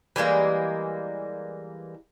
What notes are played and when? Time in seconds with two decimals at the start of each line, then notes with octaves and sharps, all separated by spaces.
0.16 E3 G3 G#3 A#3